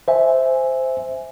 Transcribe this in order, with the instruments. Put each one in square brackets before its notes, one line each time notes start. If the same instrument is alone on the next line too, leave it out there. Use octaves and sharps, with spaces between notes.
[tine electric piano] C5 E5 G#5